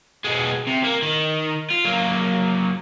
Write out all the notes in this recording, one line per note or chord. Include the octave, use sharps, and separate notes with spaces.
B2 G#3
C3
A#3
D#3
F4
F#3 A#3